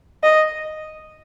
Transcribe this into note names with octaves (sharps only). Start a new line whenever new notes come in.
D#5